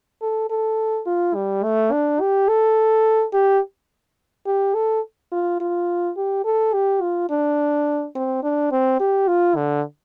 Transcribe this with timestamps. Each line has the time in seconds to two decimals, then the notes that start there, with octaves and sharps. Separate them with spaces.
0.22 A4
0.50 A4
1.06 F4
1.35 G3
1.63 A3
1.92 D4
2.21 G4
2.49 A4
3.33 G4
4.46 G4
4.75 A4
5.32 F4
5.60 F4
6.17 G4
6.45 A4
6.73 G4
7.02 F4
7.30 D4
8.15 C4
8.43 D4
8.72 C4
9.00 G4
9.28 F4
9.56 D3